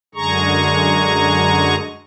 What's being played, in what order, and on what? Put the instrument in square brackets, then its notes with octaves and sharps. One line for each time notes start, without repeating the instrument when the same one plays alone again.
[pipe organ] F#2 D3 G#3 G#4 A#5 C#6